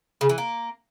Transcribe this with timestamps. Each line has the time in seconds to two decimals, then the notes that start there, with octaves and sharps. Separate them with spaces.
0.21 C#3
0.29 E3
0.38 A#3